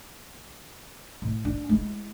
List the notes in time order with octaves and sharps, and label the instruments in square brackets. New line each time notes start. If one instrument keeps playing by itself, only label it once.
[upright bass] A2
D4
G#3 E4